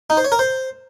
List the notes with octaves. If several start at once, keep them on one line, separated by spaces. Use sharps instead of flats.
D#4
C5
C#5
A#4
C5